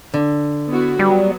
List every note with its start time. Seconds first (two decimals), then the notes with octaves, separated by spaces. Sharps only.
0.14 D3
0.70 B3 E4 F#4
0.99 F#3 G3 B3